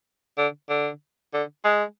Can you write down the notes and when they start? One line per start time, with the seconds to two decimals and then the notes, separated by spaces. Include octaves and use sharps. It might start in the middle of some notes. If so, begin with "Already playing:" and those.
0.38 D3
0.70 D3
1.34 D3
1.64 G#3